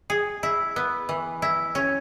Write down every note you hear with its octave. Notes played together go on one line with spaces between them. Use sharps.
G#4
E4
B3
E3
E4
C#4